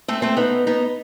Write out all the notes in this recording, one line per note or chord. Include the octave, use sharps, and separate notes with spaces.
A3 C4
A3 C4
B3 D#4
B3 D#4